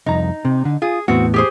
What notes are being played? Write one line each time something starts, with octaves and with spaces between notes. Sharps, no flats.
C2 F2 D#4 A#5
C3
D3
F4 G#4
E2 A2 B3 C4 F#4
G4 G#4 C5